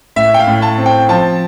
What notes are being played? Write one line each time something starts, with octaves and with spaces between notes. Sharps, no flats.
A2 E5
G5
F5
A2
A5
C4
G5
F3 A5